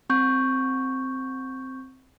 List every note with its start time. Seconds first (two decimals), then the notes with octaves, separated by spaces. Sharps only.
0.10 C4 C#6 G6